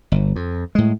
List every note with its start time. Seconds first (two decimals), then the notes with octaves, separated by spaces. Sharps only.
0.12 G1
0.36 F2
0.75 A2 G#3